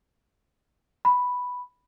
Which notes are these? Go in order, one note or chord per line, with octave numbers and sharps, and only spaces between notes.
B5